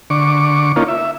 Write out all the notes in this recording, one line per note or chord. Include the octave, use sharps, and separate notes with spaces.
D3 C#6 D6
A#3 C#4 D#4 F4
E5